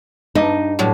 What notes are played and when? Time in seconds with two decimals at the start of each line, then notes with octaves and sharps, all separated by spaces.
0.35 G2 D#4
0.79 A2 F#3 G3